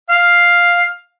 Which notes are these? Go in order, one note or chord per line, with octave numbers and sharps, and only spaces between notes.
F5